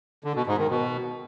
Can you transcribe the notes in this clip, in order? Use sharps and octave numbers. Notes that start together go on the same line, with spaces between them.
D3
B2
G#2
D#3
B2